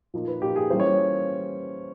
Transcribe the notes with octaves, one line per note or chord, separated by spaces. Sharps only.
A#2 F3 A#3 D#4
B4
A#2 F3 A#3 D#4 G4
G#4
E3 G3 A#3 C#4 F4 C5
C#5